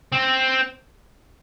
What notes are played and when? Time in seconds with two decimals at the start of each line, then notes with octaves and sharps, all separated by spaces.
0.12 C4